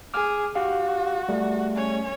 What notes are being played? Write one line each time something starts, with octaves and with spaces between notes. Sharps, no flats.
G#4 D6 F6
F#4 G4 F5
G3 A3
C#4 C#5